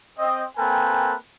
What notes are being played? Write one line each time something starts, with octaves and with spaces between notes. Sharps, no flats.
C4 D#5
A#3 C4 A4 B4 G5 G#5